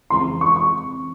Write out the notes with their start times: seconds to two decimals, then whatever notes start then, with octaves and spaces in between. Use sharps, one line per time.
0.10 F2 C#3 E3 G#3 C4 C6
0.41 C#6
0.56 C#6